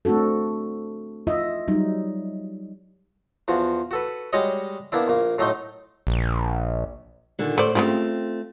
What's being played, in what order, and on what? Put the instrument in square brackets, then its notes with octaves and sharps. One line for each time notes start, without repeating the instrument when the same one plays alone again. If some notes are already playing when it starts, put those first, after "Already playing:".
[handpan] A3 C4 D4 F#4 A4
E4 F4 D#5 E5
F#3 G3 D#4
[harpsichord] E2 F3 F#4
F#4 A4 B4
G3 G#3 F#4 C#5 D#5
A#3 B3 D4 E4
A#1 A#3
A2 F#3 A3 D#4 C6
[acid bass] A#1
[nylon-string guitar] A#2 D3 D#3
[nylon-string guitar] A2 C5 [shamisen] A3 D5
[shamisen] C#3 F#3 G3 [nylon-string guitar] A3 C4 F4